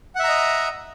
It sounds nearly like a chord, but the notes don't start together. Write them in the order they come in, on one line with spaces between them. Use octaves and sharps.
F#5 E5 A#5 D#5